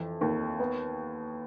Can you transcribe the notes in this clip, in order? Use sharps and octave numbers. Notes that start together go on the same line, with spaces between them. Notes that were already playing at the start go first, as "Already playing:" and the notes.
Already playing: F2 E3
D#2
B3